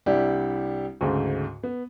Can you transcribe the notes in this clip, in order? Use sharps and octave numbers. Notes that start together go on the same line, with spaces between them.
C2 G3 D4 E4 G4
D2 G#2 C#3
B3